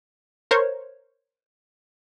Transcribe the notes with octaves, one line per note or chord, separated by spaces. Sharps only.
A#4 C5 C#5